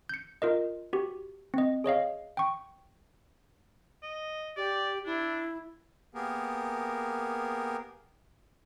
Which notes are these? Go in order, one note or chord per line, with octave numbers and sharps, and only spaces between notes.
G6 C#7
F4 A#4 D#5
F#4 G4
C4 D#5
G#4 C#5 D#5 F5
G5 C#6
D#5
G4 D5
D4 E4
A#3 B3 G4 G#4 A#4